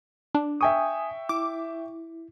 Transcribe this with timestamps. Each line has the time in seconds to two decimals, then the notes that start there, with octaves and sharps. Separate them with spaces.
0.35 D4
0.61 E5 G5 G#5 C#6 D#6
1.29 E4 D6